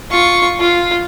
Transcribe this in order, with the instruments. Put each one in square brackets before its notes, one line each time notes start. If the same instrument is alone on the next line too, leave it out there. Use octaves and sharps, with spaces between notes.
[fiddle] F4 C#6
F4